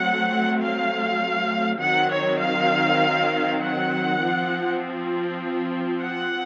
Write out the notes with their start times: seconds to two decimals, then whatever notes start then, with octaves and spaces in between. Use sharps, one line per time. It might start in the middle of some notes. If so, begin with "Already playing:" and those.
Already playing: F#3 A3 C4 F#5
0.62 F5
1.81 D#3 F#3 C4 F#5
2.11 C#5
2.41 F5
3.61 F#5
4.21 F3 C4
6.01 F#5